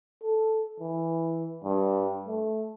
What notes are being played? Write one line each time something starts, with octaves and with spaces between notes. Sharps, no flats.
A4
E3
G2
A3